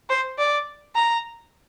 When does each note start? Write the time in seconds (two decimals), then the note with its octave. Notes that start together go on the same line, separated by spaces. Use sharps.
0.10 C5
0.38 D5
0.95 A#5